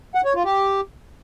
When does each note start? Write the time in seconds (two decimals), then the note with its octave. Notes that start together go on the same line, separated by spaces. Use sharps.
0.15 F#5
0.25 C#5
0.35 F4
0.45 G4